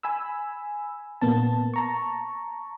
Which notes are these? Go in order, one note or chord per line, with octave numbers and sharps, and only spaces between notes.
G#5 B5 E6
A#2 A#3 B3 A5
A5 A#5 C#6